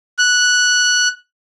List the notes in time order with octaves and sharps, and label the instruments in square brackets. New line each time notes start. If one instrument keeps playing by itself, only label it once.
[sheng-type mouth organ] F#6